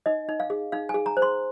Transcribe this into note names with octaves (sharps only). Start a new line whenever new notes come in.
D#4 D#5
D#4
F5
G#4
D#4 F5
G#5
G#4
A#5
C5
C6